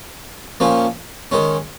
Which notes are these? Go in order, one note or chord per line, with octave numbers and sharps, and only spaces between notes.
A#2 F3 A#3 C#4
D#3 G#3 C#4